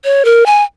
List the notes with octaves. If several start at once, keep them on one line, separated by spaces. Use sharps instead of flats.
C#5
A#4
G#5